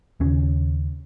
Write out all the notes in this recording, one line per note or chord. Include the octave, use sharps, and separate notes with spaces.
D#2 C#3 C#4